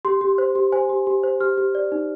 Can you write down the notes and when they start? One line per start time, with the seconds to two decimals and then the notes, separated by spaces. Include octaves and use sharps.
0.05 G4 C6
0.21 G4
0.38 C5
0.55 G4
0.72 C5 G#5
0.89 G4
1.07 G4
1.23 C5
1.40 G4 F6
1.58 G4
1.75 D5
1.92 D#4